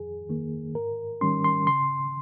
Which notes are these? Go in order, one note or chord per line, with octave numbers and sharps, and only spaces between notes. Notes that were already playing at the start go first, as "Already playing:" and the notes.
Already playing: F2 G#4
D#3 A#3
G#2 A#4
D#3 G3 C#4 C6
C6
C#3 C6